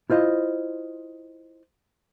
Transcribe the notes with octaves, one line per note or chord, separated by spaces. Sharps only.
E4 F4 C5 D#5